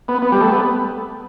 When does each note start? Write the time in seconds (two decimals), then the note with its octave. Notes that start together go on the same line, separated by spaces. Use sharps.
0.08 B3
0.22 B3
0.32 G3
0.41 A3
0.51 B3